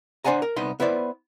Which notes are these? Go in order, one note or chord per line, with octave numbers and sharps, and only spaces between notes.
D4 C5 D5 F#5 G#5 A#5
A#4
C2 B3 D#4 B5 C6
B3 E4 B4 C5 D5